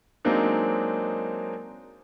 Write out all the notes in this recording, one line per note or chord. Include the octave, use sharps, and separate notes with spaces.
F#3 G#3 A#3 C4 D4 D#4